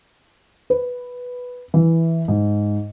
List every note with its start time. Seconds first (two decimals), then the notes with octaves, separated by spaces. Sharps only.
0.70 B4
1.74 E3
2.28 G#2